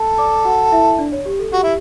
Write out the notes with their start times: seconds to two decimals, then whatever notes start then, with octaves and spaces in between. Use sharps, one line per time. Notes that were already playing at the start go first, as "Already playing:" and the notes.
Already playing: A4
0.18 D5 D6
0.45 F#4 F#5
0.72 E4 E5
0.99 D4 D5
1.12 C#5
1.26 G4
1.39 A4
1.52 F#4 G4
1.63 E4